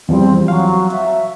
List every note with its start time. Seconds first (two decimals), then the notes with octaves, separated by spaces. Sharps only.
0.09 E2 F3 G3 C4
0.48 F#3 F5
0.91 E5